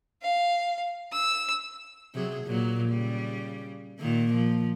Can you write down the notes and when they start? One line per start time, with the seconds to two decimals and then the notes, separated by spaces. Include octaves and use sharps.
0.22 F5
1.13 E6
2.14 C3 F#3 G#4
2.45 A#2 F#3
2.89 C#3 G3
3.99 A#2 D#3 A#3
4.34 F3